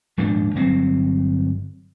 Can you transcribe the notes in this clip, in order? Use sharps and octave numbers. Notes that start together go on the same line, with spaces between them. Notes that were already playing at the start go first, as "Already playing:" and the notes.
D#1 G#2 F3 D4
G1 F#3 C4